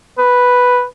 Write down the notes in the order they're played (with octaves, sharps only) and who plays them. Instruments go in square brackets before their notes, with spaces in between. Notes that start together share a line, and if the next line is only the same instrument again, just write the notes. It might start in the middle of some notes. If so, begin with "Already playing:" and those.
[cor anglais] B4